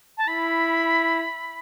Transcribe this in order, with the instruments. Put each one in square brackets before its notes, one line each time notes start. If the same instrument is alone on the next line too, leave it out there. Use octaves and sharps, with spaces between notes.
[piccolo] A5
[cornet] E4 [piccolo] B5